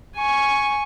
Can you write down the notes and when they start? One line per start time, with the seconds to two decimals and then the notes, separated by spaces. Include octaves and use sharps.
0.17 G#5 C#6